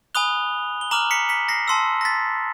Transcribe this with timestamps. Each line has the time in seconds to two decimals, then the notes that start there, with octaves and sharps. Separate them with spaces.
0.15 G#5 B5 D#6 F#6 F7 G7
0.81 G7
0.91 A#5 D6 F6 E7 F#7
1.11 B6 C#7
1.29 B6 C#7
1.49 A#6 C7
1.68 A5 C6 E6
2.01 A#6
2.05 A6 B6